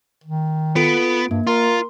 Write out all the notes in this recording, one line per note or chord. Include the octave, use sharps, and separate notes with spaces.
D#3
B3 F4 A4 D7
G2 A#3
F4 A#4 C6